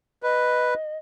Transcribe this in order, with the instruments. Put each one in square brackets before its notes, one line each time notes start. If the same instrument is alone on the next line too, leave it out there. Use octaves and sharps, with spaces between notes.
[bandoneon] B4 [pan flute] D#5